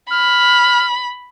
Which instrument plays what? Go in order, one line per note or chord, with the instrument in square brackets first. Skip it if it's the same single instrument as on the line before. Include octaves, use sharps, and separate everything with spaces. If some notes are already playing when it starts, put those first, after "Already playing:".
[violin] B5 [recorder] F6